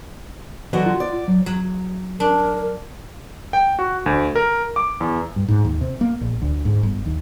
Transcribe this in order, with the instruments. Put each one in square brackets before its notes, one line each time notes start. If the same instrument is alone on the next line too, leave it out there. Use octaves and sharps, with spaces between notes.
[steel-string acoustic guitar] D3 F#3 F#4 [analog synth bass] E3
[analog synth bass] F4
[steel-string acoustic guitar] D5
[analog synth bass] F#3
[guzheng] F#3
[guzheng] D4 [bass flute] A#4
[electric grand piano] G5
F#4
D2
A#4
D6
E2
[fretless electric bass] G2
G#2
D#2
C3
A#3
A#1
D2
G#2
G1
D#2